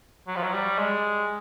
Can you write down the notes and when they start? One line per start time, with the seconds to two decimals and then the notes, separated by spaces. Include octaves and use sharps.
0.27 F#3
0.36 F3
0.43 F#3
0.54 G3
0.78 G#3